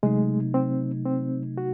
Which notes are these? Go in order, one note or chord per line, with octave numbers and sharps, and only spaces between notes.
C3 F#3 G#3 A3 D#4
C4
C4
F#4